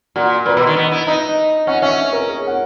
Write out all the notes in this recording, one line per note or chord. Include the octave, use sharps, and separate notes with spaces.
A#2 F#4
A#2 B4
B2
D#3
B3
E4
D#4 D#5
C#4 F#5
C#4 E5
C#5
A#4
G#4
F#5